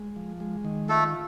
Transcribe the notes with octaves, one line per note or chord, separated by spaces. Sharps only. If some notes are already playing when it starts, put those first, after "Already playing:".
Already playing: G#3
F3
G#3
D#3
A3 F4 A4